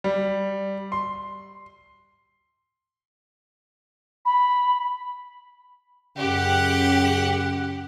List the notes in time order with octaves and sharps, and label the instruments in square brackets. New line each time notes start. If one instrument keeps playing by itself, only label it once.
[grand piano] G3
C6
[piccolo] B5
[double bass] F#2 [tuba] C#3 [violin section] G4 [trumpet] F#5